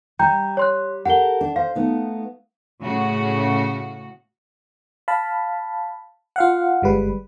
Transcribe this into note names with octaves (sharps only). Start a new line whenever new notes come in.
G3 G5 A#5 G6
C#5 C6 F#6
G4 A4 A#4 F#5 G7
D4
C5 F5
A3 B3 D#4
A2 C#3 F#4
F5 A5 B5
F4 F5 F#5
G1 G3 G#3 B4